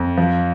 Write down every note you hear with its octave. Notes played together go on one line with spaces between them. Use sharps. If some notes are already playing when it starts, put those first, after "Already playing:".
Already playing: F2
F3